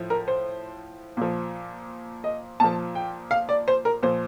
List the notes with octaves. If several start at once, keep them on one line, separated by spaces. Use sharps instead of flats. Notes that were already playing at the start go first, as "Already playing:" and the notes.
Already playing: A2 F3
A#4
C5
A#2 F3
D#5
A#2 F3 A5
G5
F5
D5
C5
A#4
A#2 F3 C5